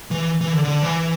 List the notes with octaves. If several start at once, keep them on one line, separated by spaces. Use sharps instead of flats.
E3
E3
D3
D3
E3